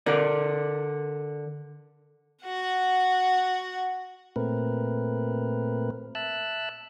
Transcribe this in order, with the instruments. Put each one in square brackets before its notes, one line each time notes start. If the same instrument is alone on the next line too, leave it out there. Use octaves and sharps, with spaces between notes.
[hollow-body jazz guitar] D3 A#4 D5
[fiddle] F#4 F#5
[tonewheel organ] A#2 A3 C4 A#4 B4
E5 A5 E6 F#6